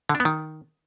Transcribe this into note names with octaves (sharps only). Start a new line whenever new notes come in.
D3
D4
B3
D#3